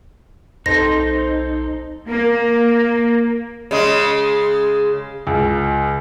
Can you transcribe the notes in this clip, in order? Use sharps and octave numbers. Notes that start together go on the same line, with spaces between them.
B1 C4 D#4 A4 C5 A#6
A#3
C#3 G#3
C#2